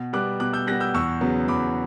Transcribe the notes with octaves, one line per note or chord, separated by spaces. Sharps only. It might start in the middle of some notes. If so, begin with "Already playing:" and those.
Already playing: B2
G3 B3 D6 F#6
B2 D6 F#6
E6 G6
G3 B3 F#6 A#6
E6 G6
E2 C#6 E6
C#3 F#3 B3
E2 B5 D6